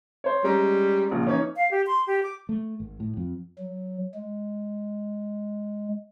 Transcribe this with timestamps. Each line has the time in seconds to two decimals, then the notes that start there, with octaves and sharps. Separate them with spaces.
0.24 C5 C#5
0.44 G3 G#3 C#4 A#5
1.11 A#1 C#3 F3
1.27 E3 C#4 D#4 C#5
1.57 F5
1.71 G4
1.87 C6
2.07 G4
2.23 D6
2.49 A3
2.80 G#1
3.00 A2
3.17 F2
3.59 F#3
4.15 G#3